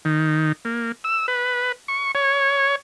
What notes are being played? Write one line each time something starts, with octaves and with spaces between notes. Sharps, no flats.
D#3
A#3
E6
B4
C#6
C#5